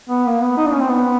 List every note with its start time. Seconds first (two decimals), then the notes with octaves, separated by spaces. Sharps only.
0.09 B3
0.26 A#3
0.41 B3
0.57 D#4
0.66 D4
0.74 C#4
0.81 C4
0.90 B3